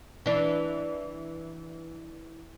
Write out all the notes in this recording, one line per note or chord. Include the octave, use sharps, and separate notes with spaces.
E3 D4